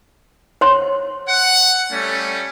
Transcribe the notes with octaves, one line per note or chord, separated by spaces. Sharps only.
C5 C#5 C6
F#5
G3 A3 C#4